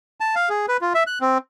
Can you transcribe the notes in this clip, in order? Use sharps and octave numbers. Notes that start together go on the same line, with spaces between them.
A5
F5
G#4
B4
F4
E5
F#6
C4